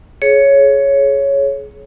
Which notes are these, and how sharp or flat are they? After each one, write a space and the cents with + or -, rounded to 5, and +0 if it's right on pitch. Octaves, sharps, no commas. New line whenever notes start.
G#4 +25 C#5 +0